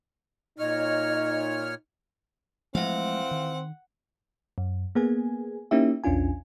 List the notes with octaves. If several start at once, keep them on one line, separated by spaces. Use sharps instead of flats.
A#2 D#4 C#5 D#5 F6
E3 F3 G#3 A3 C4 F5 F#5
D#3
F#2
A#3 B3 G#4 G#5
A#3 C#4 D#4 E4 G4 E5
A#1 E2 C#4 D4 F4 G#5